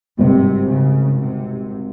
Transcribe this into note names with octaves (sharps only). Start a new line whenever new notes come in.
G#1 G2 C3 G3 C4
C#3
C3